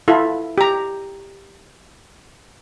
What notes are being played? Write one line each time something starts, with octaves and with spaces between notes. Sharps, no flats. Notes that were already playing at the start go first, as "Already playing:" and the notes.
E4 F4 A4
G4 A#5